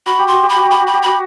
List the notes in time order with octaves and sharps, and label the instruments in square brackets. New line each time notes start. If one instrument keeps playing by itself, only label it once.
[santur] F#4 [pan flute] B5
[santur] G4
[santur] F#4 [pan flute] C6
[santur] G4
[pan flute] B5
[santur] F#4
[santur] G4 [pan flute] B5
[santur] F#4
[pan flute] B5
[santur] G4
[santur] F#4 [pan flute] B5